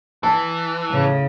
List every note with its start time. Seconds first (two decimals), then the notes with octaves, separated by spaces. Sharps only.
0.23 E3 A5
0.91 A2 C#3